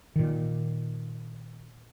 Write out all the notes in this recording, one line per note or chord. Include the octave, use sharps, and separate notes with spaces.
A#2 D#3